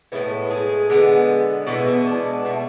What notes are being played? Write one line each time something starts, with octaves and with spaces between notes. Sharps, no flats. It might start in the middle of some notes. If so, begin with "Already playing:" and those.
A2 E3 G#3 B3 E4
G#3 G#4
D3 G#3 B3
B2 E3 G#3 B3 E4
D4
B2 A3 D4
E4